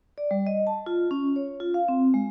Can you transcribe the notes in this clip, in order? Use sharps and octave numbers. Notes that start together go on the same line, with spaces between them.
D5
G3
D#5
A5
F4
C#4
C#5
F4
F5
C4
G#3